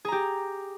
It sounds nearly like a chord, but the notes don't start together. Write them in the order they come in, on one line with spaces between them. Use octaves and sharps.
G#4 A#5 G4